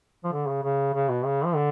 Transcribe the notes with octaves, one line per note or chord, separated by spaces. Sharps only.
F3
D3
C#3
C#3
C#3
B2
C#3
F3
D3